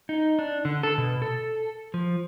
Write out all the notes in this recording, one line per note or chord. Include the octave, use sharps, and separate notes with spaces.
D#4
D4
D3
A4
B2
A4
F3